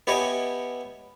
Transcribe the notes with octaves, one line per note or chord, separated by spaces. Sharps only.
B3 E4 G4 C#5 D#5 G#5